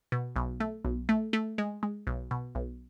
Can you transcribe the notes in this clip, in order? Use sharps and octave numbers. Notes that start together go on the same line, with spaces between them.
B2
B1
A3
B1
A3
A3
G#3
G#3
B1
B2
B1